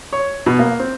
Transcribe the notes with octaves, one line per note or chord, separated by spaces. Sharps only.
C#5
B2
A#3
C4